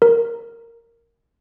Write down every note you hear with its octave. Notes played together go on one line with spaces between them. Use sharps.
A#4